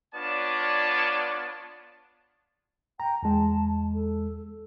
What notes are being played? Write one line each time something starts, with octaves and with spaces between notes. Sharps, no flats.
B3 D4 F4 C#5 D5 A5
G5 A#5
E2 G#3 A5
A4